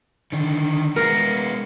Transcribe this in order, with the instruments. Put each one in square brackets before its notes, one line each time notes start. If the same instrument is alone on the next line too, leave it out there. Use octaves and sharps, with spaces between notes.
[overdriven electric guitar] D3 D#3
[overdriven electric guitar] G#3 B3 [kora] A#4